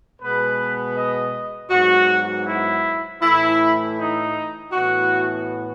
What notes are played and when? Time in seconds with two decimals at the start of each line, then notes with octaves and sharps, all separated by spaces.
0.20 B2 G#3 B3 B4
0.95 D#5
1.71 G#2 F#3 B3 F#4
2.46 E4
3.21 A2 E3 A3 E4
3.97 D#4
4.72 A2 E3 B3 F#4